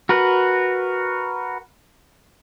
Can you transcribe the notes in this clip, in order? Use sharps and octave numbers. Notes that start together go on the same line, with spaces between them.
F#4 A#4 B4